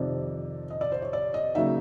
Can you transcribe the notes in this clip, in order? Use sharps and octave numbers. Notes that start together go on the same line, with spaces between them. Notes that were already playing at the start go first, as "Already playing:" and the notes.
Already playing: F2 C3 D#3 D5
D#5
D5
C5
C#5
D5
D#5
C#3 F#3 A#3 D#4 E5